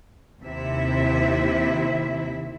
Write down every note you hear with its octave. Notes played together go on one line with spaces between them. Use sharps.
D#2 C3 E4 E5